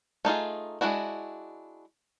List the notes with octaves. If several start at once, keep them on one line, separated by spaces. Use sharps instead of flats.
A3 D#4 F4 G#4
G#3 C4 D4 E4 F#4